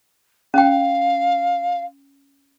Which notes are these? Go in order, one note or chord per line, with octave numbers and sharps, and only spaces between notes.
C#4 F5 G5